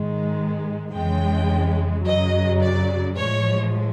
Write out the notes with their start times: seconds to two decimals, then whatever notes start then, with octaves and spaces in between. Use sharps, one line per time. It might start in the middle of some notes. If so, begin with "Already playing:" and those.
Already playing: G#2 D#3 G#3
0.94 F2 C#3 E3 G#3 G5
2.05 F#2 C#3 F#3 D#5
2.61 D5
3.17 A2 F3 G#3 C#5